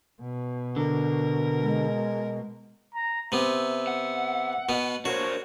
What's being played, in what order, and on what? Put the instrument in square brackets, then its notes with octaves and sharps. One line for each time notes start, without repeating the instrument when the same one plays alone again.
[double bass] B2
[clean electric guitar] D3 [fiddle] A#4
[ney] G#3
[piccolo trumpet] A#5
[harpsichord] C3 B3 [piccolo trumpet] E5
[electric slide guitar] F#5
[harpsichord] B2 B3
[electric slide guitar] D4 A#4 C5 [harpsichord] F#4 [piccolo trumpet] C#5